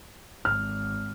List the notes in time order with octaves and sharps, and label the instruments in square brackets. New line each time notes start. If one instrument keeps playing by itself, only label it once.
[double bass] G#1 [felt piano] F6